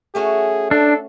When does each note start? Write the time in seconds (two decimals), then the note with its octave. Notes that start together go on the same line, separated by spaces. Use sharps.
0.15 A3 C#4 F#4 G#4
0.71 D4 A4